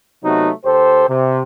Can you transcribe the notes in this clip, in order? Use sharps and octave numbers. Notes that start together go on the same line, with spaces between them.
C3 F#3 A3 B3 D#4 F#4
D#2 G4 A4 C5
C3